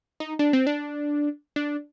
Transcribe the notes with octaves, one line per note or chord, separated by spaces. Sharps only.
D#4
D4
C4
D4
D4